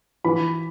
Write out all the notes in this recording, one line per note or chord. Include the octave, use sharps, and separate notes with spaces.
E3 B5